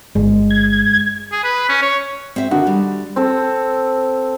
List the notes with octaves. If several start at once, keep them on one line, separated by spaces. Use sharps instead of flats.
G1 G#3
G#6
G#4
B4
C#4
C#5
C4 E5
D3 D#3 F#4
G3
C4 A4